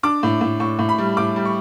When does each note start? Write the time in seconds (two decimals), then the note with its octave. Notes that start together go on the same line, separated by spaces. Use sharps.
0.03 D4 D6
0.23 A2
0.41 A2
0.60 A2 C#6
0.79 A2
0.89 B5
0.98 G3
1.17 A2 D6
1.36 G3
1.45 C#6